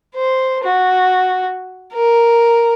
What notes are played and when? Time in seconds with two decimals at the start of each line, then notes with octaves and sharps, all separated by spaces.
0.15 C5
0.64 F#4
1.93 A#4